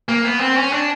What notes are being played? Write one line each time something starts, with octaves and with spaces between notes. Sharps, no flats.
A#3
B3
C4
C#4
D4